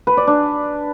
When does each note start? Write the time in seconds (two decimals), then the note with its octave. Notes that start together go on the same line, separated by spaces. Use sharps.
0.07 B4
0.17 D5
0.27 D4